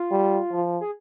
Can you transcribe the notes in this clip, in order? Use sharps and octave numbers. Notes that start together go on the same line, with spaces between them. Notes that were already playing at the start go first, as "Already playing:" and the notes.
Already playing: F4
G3
F3
G#4